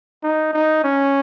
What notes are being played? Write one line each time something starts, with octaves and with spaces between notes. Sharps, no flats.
D#4
D#4
C#4